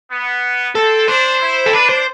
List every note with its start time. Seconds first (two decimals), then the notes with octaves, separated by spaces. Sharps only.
0.11 B3
0.75 C4 A4
1.08 D4 C5
1.41 E4
1.66 A4
1.73 D4 B4
1.89 C5